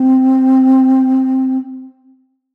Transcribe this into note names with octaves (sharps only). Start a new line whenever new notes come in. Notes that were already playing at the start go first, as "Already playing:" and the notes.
Already playing: C4